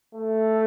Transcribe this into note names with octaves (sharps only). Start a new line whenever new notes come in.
A3